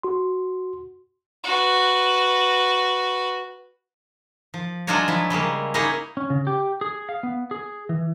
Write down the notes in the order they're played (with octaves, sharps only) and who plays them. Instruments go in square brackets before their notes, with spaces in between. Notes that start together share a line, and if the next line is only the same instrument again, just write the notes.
[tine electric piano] F#4 C6
[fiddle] F#4 B4
[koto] F3
F#3 G#3 D4 F4 F#4 C#5
F3 E4
C#3 G3 G#3 A#3
A#3 D#4 E4 G#4 C#5 D#5
[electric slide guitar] C#4
C#3
G4
G#4
F5
B3
G#4
E3